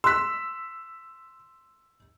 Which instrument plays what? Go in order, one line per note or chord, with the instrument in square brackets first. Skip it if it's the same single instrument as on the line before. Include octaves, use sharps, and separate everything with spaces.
[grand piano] C6 F#6 [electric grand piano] E6 B6